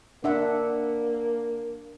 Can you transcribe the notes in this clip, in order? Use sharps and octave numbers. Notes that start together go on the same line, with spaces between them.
A#3 D4 E5 F#5